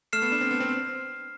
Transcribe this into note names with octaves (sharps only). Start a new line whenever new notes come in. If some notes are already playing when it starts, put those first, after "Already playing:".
A3 F6 C7 E7
B3
D4
C4
B3
C4